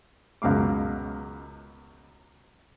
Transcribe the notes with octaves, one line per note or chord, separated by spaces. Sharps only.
C#2 F#2 B2 F5 D6